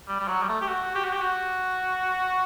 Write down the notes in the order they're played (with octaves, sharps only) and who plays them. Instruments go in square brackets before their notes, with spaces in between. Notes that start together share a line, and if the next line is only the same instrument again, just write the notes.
[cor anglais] G3
G3
F#3
G3
A3
G4
F#4
G4
F#4
G4
F#4